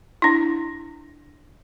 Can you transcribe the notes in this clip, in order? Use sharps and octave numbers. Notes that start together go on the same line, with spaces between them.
D4 E4